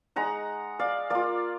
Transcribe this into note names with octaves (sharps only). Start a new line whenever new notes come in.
G#3 D#4 F#5 A#5
D5 F5
A#3 F4 D5 F5